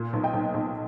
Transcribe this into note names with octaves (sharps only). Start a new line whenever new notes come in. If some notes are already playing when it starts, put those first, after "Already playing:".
Already playing: A#2
B1
D#5 G5
B1
B1